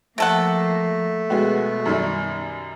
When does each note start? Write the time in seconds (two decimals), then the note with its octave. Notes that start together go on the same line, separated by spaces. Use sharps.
0.18 C3 F3 A3 A#3 A4 F#5
1.30 B2 G#3 B3 F#4
1.86 F#2 D#3 G3